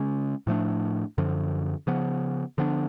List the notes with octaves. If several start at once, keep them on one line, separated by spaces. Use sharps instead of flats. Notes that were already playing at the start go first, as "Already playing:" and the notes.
Already playing: C#3 G#3 C#4
A2 F3 A3 D4
F#2 D3 F3
C#3 F3 B3
D3 F3 B3 D4